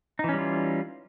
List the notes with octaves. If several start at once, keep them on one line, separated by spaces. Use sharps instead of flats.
E3 G3 C#4 D#4 F4